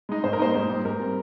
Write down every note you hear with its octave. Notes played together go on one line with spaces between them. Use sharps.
G#3 D#4
G#2 C5
A#4
G3 A#3 D#4 C5
G#2
G3 A#3 D#4
G#2 A#4
G3 C4